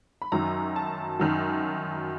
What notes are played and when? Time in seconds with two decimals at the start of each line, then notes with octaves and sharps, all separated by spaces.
0.22 B5
0.32 F#2 D#3 F#3 A#5
0.76 A5
1.20 F#2 D#3 F#3